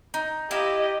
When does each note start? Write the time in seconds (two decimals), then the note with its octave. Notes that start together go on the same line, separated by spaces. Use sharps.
0.14 D#4
0.51 E4 G4 D#5 F5